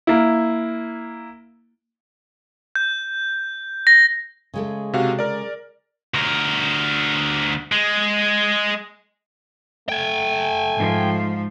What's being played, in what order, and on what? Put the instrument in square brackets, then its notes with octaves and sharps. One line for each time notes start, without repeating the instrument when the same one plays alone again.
[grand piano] A#3 E4
[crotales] G6
A#6
[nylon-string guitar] C#3 G#3 A3
[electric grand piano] C3 F#4 F5
A#4 D5
[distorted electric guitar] D2 A#4
G#3
[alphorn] A3 [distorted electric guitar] G5 G#5
[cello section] G#2 F3